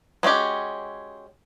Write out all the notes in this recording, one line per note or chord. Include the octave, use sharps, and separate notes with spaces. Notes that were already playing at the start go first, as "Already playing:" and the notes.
G#3 C#4 F#4 G4